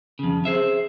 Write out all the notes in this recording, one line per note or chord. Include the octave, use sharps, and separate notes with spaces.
F2 C#3
G#4 C5 E5